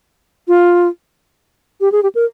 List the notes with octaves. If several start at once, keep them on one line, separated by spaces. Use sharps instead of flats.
F4
G4
G#4
G4
A#4